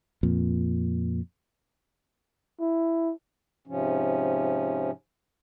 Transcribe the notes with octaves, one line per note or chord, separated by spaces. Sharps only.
F2 A#2
E4
G#2 C3 F3 C#4